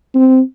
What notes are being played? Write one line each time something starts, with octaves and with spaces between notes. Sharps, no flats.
C4